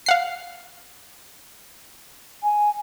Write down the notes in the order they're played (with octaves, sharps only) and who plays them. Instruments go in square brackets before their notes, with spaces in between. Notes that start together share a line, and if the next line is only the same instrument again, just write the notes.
[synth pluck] F5 F#5 C7
[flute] G#5